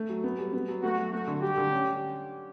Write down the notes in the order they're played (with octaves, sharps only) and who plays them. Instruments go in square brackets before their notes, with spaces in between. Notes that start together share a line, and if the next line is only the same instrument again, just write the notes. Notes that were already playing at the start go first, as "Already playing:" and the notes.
Already playing: [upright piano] A3
F#3
B3
G3
B3
F#3
[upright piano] A3 [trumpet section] F#4
[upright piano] F#3
[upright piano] A3 [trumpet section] F#4
[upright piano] D3
[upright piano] G3 [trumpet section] G4
[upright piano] D3
C#4